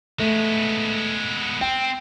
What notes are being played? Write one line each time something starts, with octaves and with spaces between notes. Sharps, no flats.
G#3 A3 B3
C4 G5